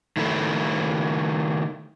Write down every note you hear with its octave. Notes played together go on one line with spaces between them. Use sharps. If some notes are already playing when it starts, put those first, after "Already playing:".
D#3 A3 E4